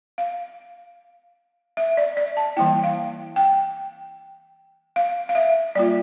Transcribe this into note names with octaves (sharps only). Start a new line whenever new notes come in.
F5
E5
D5
D5
A5
E3 G3 A#3 E4 G5
F5
G5
F5
F5
E5
G3 A#3 F4 D5